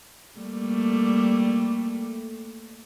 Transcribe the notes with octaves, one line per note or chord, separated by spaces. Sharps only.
G3 A3 A#3